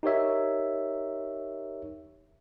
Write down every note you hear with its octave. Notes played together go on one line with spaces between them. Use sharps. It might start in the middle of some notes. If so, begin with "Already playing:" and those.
D#4 G4 A#4 C#5 E5